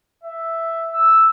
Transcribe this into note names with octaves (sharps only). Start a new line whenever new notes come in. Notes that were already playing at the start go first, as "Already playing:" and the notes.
E5
E6